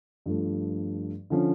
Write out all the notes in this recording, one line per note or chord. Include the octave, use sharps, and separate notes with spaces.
G2 F3 A3
D3 F3 C#4